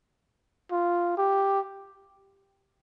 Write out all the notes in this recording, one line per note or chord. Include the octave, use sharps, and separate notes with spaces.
F4
G4